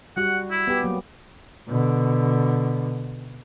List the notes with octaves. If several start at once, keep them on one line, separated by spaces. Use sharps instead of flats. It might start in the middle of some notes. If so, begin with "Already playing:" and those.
G3 F#4 F#5
E4
B3 G4
F#3 A#3
B2 D3